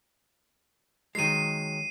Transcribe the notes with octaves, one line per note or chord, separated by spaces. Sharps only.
D#3 F#3 G#3 C7 D#7